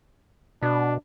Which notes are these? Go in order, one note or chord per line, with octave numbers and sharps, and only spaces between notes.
B2 D4